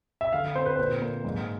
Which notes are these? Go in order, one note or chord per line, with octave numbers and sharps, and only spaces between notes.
E5
D3 F5
C4 C5
B4
A#2 C5
A#3
G#2